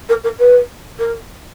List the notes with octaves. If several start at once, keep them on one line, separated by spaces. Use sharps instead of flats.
A#4
A#4
B4
A#4